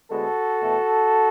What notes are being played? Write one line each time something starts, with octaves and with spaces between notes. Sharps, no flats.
D2 D3 G#3 B3 F#4 A4
E2 B2 A3